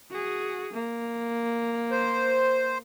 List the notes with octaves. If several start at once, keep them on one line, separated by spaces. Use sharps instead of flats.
F#4 G#4
A#3
C5